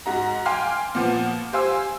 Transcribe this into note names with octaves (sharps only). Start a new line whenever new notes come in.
G#2 F#4 A#5
F5 G5 G#5 C6 D6 F6
A#2 F3 B3
G4 C5 F5 G#5 E6